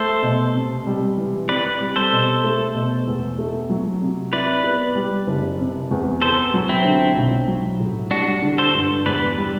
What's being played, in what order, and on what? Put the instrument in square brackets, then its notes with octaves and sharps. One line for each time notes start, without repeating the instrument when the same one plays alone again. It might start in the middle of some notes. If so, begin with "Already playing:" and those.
Already playing: [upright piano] A3 [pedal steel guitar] A4 C5
[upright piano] B2
C3
G3
E3
[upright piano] C4 [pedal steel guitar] B4 D5
[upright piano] G3
[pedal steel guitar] A4 C5
[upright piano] B2
A3
B2
E2
A3
F#3
C3
[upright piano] E4 [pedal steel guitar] B4 D5
[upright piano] B3
G3
F#1
C3
E2
[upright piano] B3 [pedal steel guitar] A4 C5
[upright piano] F#3
[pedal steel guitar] C4 E4
[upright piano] D3
B1
F#3
A2
[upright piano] G3 [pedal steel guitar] D4 F#4
[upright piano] D3
[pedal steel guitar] A4 C5
[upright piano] G2
[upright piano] E2 [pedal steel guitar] B4 D5
[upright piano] G3